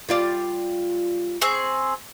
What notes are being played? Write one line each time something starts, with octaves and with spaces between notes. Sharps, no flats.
G3 F4 D5
C4 G#4 C#6